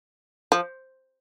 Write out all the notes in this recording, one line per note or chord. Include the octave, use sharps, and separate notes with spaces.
F3